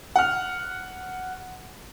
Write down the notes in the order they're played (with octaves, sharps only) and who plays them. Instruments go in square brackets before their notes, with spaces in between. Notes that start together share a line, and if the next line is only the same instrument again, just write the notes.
[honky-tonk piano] F#5 F6